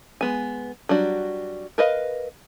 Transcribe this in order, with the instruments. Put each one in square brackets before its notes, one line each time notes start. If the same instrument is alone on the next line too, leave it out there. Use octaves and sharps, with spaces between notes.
[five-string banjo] G#3 B3 G#5
F#3 G3 D4 F#4
A#4 B4 D#5 F5